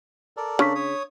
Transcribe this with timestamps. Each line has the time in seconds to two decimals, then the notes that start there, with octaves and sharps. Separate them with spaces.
0.37 A4 A#4 D5
0.59 C#3 D4 C#6 B6
0.75 C#5 D#6